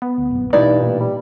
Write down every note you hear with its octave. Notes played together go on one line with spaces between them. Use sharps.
B3
D2
A#1 F#2
G2 B2 E3 A3 D#4 E4 D5
A#2
G3